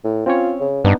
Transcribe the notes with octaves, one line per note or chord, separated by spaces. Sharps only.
A2
C4 C#4 F4 C#5
C#3
G2 B3 D4 D#4